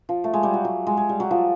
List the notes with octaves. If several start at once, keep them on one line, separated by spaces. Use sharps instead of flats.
F3
A3
G#3
G3
F#3
F#3
G#3
G#3
G3
F#3
F3